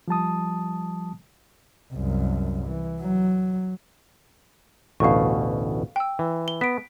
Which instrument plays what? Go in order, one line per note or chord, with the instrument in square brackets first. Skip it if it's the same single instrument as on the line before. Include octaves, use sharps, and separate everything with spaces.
[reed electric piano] F3 G3 A5 D#6
[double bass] C2 F#2
E3
F#3
[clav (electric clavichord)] A1 D2 B2 [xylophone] F5 C#6
[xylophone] G5 E6
[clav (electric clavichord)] E3
[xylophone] G7
[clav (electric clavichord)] B3 [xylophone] B6 D7